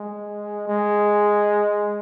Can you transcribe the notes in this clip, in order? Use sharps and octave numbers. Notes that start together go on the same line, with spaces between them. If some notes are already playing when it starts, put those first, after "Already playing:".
Already playing: G#3
G#3